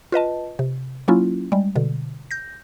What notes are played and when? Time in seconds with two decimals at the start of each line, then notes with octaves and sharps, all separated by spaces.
0.12 F4 B4 D#5 A5
0.59 C3
1.08 F#3 A#3 C#4 E4 F4
1.52 G3 G#3
1.76 B2 D3
2.31 G6 A#6